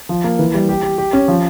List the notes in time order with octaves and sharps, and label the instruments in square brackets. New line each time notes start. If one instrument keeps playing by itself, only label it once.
[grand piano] F3
A#3
E3
G3
G4
G4
G4
C#4
F3